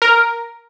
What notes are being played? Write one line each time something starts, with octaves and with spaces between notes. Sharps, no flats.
A#4